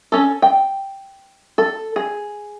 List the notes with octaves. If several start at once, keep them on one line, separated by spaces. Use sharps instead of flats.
C#4 A4
G5
A4
G#4